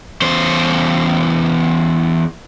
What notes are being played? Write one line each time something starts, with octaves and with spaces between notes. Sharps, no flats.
E2 C5